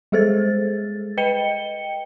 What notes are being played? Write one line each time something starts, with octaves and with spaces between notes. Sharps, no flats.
G3 G#3 G#4 A4 C5 A6
B4 D#5 G5 C#7 G7